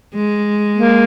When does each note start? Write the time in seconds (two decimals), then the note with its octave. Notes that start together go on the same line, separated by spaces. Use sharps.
0.14 G#3
0.76 A#3